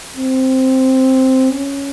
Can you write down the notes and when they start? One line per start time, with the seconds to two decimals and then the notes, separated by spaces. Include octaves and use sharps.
0.16 C4
1.51 C#4